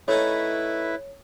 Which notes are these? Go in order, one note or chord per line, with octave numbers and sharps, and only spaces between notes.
A3 C#4 D#4 E4 B4 C#5